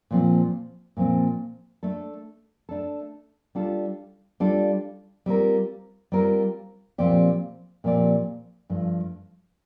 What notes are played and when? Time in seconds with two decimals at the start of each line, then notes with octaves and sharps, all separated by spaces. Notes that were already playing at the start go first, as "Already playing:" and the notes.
0.11 A#2 F3 C4
0.97 A#2 F3 C4
1.83 A3 D4 A4
2.69 A3 D4 A4
3.55 G3 D4 F4 A4
4.40 G3 D4 F4 A4
5.26 G3 C4 F4 A#4
6.12 G3 C4 F4 A#4
6.98 A#2 F3 C4 G4 D5
7.84 A#2 F3 C4 G4 D5
8.70 G2 F3 A3